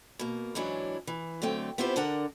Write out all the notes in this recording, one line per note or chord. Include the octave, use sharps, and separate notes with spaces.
B2 A#3
G#2 E3 F#3 C#4 D4 E4
E3
D3 F#3 A3 C4 G5
B3 C4 E4 F4 G4 C5
D3 D4 A#4 F#5